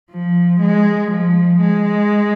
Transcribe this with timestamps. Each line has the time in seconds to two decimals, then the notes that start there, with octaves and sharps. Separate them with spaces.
0.11 F3
0.60 G#3
1.11 F3
1.61 G#3